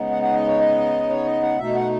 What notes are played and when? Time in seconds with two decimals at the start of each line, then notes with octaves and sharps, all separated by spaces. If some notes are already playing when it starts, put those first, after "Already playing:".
Already playing: C#3 G#3 B3 D#4
0.10 F#5
0.22 F#5
0.34 D#5
0.46 C#5
0.60 D#5
1.10 C#5
1.25 D#5
1.42 F#5
1.59 B2 A3 D#4 E5
1.75 F#5